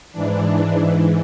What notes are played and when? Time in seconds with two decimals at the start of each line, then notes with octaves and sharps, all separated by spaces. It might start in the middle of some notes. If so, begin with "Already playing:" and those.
0.12 G#2 E3 D4